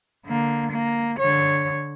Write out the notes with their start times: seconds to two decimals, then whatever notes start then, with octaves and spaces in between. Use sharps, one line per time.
0.25 D3 A#3
0.71 A#3
1.19 D3 C#5